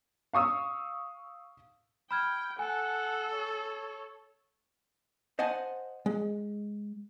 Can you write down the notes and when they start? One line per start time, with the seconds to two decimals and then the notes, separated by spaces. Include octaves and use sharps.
0.33 F5 C#6 D#6 E6
2.11 G5 B5 F6 G#6
2.59 A4 F#5 G#5
3.33 C#5
5.39 C5 D#5 F#5 G#5 A5
6.06 G#3